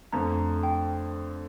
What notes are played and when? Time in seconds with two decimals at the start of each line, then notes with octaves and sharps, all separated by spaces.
0.13 F2 D3 A3 A#5
0.63 G5